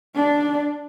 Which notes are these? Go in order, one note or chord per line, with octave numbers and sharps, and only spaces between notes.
D4